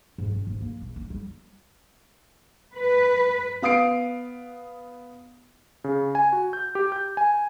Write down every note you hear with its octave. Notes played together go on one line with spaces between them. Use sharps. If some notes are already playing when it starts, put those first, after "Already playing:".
G#2
C#4
G#2
A#3
A#1
A#3
G3
B4
B3 F5 D#6 C7 D7
C#3
G#5
F#4
G6
G4
G6
G#5